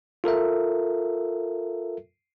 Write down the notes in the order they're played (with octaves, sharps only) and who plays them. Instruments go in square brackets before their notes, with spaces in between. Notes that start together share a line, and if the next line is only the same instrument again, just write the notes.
[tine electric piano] F4 A4 A#4 E5